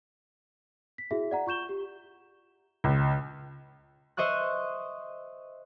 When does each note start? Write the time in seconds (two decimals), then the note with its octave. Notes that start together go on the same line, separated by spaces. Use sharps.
0.98 B6
1.11 E4 F#4 G#4 E5
1.31 D5 F#5 A#5
1.47 F4 C#6 G6 E7 G7
1.69 G4
2.84 C#2
4.17 C5 D#5 E5 C#6 F#6